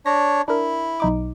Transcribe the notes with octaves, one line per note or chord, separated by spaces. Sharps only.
D4 C#5 A#6
D4 E4 A#4
B1 D#4 D6